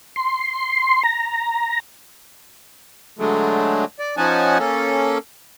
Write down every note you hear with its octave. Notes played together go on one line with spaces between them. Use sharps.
C6
A#5
D3 F#3 G#3 A3
D5
F3 C#4 D#4 F#5 G#5 A5
A#3 C#4 A4